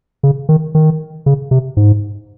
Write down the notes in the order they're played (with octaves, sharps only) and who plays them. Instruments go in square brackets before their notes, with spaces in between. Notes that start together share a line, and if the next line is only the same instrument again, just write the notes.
[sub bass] C#3
D#3
D#3
C#3
C3
G#2